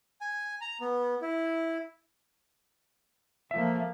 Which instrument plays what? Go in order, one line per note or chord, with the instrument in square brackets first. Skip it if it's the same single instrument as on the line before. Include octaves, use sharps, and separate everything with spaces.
[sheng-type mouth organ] G#5
A#5
B3
E4
[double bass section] F3 A3 A#3 [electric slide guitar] E5